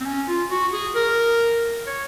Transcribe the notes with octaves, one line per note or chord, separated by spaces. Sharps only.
C4
C#4
F4
F#4
G#4
A#4
C#5